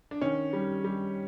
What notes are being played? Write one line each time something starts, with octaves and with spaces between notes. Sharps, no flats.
D4
D#3 C#4
G3
G3